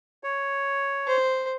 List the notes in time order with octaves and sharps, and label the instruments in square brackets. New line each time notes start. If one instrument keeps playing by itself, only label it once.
[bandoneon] C#5
[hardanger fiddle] C5